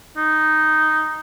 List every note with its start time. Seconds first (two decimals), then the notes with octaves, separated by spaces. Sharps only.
0.17 D#4